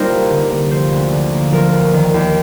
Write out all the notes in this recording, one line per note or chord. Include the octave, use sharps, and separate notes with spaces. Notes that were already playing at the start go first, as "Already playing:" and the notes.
Already playing: G3 A#3 D#4 F4 A#4 C5
C2
D3
A#3
F3 C5
D2
D3
A#3
F3 A#4
D2
D#3
D#2